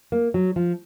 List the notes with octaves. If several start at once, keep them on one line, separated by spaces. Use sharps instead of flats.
A#3
F#3
F3